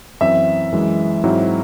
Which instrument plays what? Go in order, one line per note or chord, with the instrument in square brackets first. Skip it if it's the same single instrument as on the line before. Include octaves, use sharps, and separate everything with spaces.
[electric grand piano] F#2 E3 C4 [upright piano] E5
[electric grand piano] F#2 E3 G#3
G#2 F#3 C4 E4